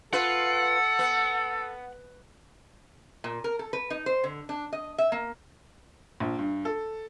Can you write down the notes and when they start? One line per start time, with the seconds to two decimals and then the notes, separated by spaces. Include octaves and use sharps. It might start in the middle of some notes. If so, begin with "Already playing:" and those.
0.13 F4 A4 B4 F#5
0.99 B3
3.24 A#2
3.44 A#4
3.59 A4
3.73 B4
3.90 D#4
4.06 C5
4.24 D3
4.49 D4
4.73 D#5
4.98 E5
5.12 A#3
6.20 A#1
6.39 G2
6.65 A4